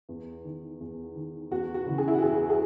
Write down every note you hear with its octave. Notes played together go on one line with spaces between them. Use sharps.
E2
D#3
E2
D#3
E2 F#4
F#4
C#3 E3
G#4
E4
F#4
E2 G#4
G#4